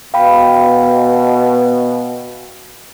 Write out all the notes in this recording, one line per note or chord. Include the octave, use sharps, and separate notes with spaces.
B2 F5 G5 B5